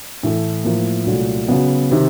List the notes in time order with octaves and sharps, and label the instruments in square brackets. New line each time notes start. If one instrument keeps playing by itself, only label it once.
[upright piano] A2 E3 A3
A2 F3 A#3
C2 A#2 F#3 A3
C#3 F#3 B3
C3 D#3